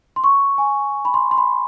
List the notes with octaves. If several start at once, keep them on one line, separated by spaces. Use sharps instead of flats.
C6
C#6
G#5
B5
C6
C6
B5